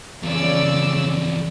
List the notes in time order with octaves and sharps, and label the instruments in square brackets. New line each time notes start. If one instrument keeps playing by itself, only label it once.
[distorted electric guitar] E2 F3 [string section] C#3 D5 E6